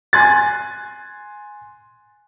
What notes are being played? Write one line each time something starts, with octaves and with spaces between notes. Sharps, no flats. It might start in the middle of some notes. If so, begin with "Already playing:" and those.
G#5 C6 F#6 G#6 A6